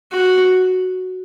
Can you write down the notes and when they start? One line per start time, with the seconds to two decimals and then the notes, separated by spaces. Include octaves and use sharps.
0.12 F#4